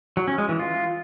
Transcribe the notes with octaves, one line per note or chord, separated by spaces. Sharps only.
F#3
C#4
G#3
E3
F4